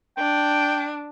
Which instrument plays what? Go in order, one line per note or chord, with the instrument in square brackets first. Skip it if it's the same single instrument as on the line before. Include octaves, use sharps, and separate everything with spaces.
[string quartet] D4 [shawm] G5